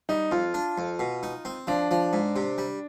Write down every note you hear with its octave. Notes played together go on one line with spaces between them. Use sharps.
G3 D#4
F2 F4
D4
F2
B2
D#4
C4
F3 D4
F3
G#2
C3
G3